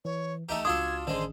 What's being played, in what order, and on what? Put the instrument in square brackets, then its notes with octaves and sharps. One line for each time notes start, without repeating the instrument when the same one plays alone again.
[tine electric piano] E3 [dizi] C#5
[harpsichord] A3 D#4 G4 [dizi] A#5
[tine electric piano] C#2 F#4 C6 [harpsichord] D4 F4 A4 [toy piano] D#6 [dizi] G#6
[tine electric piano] A1 D#3 C#4 [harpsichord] D3 G#3 [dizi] C5